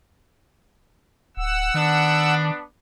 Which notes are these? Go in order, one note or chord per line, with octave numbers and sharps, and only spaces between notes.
D1 F#5 E6
D#3 B3 D4